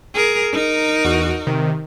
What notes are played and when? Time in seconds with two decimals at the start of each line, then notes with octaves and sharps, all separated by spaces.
0.14 G#4 A#4
0.52 D#4 A#4
1.05 E2 F#4
1.47 C3 D#3